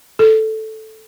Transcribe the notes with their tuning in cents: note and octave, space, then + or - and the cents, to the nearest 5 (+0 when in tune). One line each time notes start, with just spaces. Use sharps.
A4 -5